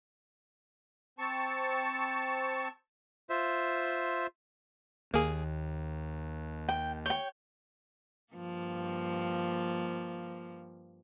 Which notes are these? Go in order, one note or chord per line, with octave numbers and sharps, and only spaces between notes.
C4 A5 C#6
F4 C5 E5
D#2 A#3 G#4
G5
C#5 G5 G6
G2 F3 A#3